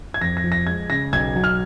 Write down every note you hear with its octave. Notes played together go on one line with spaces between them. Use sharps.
G#6
F2 A#6
A#6
F3
A#6
G#3 G#6
C#3 A#6
B1 G#6
F#3
F6